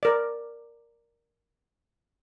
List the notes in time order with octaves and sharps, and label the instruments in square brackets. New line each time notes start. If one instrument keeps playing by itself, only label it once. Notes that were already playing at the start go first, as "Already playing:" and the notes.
[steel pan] A#4 D5